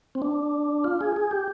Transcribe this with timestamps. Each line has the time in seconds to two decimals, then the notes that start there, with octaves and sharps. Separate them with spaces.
0.15 C4
0.22 D4
0.84 F4
1.01 G#4
1.16 G#4
1.31 G4